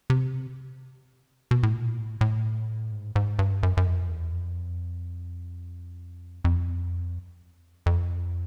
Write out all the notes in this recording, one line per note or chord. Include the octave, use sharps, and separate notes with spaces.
C3
B2
A2
A#2
A2
A2
G#2
G#2
G2
F#2
F#2
F2
E2
F2
F2
F2